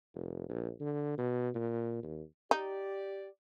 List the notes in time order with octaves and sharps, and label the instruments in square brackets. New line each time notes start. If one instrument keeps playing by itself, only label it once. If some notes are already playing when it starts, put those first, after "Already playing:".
[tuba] F1
A#1
D3
B2
A#2
D#2
[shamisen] D#4 [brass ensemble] G4 D5